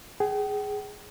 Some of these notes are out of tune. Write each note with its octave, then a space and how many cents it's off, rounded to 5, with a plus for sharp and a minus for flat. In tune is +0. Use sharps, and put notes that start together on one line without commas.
G#4 +0 G5 -40